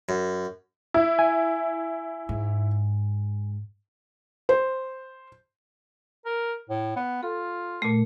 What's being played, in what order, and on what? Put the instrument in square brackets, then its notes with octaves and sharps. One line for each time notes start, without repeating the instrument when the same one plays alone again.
[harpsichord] F#2
[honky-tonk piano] E4
[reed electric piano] G#5
[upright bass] G#2
[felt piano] C5
[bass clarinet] A#4
A2
B3
[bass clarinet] F4 [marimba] A4
[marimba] A#2 A3